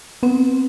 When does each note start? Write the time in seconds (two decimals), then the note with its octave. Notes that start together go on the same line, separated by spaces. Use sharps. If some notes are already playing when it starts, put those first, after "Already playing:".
0.23 B3 C4